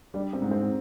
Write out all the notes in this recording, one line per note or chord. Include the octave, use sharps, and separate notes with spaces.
G3 D4
C4
G#2
C4